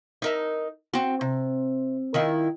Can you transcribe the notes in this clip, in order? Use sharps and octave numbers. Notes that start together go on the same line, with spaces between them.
D#4 A#4 E5
C4 F#4
C3
D#3 E4 F4